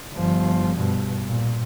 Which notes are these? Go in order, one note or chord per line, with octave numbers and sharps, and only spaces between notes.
G1 F3
G2 B2
A#2